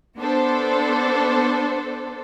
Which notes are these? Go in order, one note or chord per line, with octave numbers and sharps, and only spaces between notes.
B3 D4 A4 C5